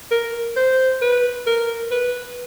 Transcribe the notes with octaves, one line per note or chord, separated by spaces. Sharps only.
A#4
C5
B4
A#4
B4